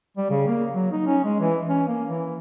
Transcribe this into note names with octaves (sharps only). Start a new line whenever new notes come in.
G3
C#3
A#3
F#3
D#4
C#4
G#3
E3
C#4
A#3
E3